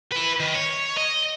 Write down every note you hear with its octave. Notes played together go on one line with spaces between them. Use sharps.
E4 B4
D#3
C#5
D#5